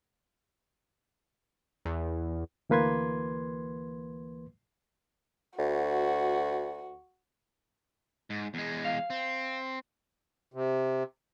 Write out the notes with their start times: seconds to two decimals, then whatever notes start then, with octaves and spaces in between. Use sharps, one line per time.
1.86 E2
2.69 D2 E3 A#3 B4 C6 G#6
5.59 D2 F#4
8.30 G#2
8.54 E2 G#3
8.85 F5
9.10 C4
10.54 C3